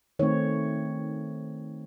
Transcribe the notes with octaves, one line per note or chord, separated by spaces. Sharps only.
D#3 A3 C4 C#5